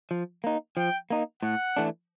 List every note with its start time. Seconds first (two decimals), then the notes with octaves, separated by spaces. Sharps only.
0.11 F3
0.44 A#3 D#4
0.77 F3 G5
1.10 A#3 D#4
1.43 A2 F#5
1.77 E3 A3 D4